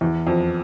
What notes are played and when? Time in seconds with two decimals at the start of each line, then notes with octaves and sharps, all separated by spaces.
0.01 E2
0.27 F2